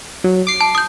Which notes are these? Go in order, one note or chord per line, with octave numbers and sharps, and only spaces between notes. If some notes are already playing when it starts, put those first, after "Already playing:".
F#3
D6 C7
A5
D#6 G6